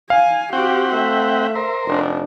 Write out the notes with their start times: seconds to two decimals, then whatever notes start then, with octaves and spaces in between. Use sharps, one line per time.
0.10 F5 G#5
0.53 C4 F#4 G4 F#5 G5
0.93 A3 E5
1.55 A#4 C5
1.86 F1 D4